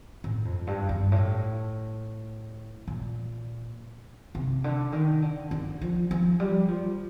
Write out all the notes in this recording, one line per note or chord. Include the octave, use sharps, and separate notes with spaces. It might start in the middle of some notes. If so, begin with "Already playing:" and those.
A2
F2
G2
G2
A2
A#2
C3
D3
D#3
D3
D3
F3
F3
G3
F3